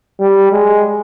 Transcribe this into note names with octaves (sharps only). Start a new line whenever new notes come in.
G3
G#3